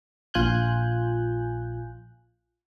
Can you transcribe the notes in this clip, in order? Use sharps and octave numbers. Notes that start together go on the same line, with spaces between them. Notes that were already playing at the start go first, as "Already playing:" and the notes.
A#1 F4 G#5 F#6 G6